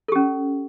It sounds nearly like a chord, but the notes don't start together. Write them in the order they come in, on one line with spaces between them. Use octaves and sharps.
A4 G4 C#4